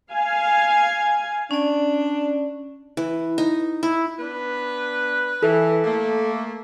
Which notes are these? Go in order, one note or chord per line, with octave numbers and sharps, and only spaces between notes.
F5 G#5
C#4 D4 D5
E3
D#4
E4
B3 D4 B4
E3 A4
A3 A#3